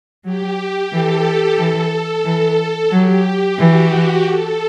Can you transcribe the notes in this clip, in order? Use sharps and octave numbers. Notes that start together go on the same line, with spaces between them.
F#3 G4
E3 A4
E3
E3
F#3 G4
E3 F#4
G4
A4